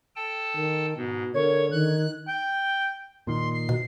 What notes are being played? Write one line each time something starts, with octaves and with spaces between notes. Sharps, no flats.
A4 G5 A5
D#3
G#2 B2
D3 A#4 C#5 G#6
D#3 F#6
G5
A#2 D#3 C6
C7
B2